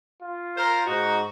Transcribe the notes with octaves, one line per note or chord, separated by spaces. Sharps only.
F4
A#4 C5
G#2 D#4 F#4